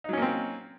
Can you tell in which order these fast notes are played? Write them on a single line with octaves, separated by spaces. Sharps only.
D#4 F#3 C#4 A#3 C4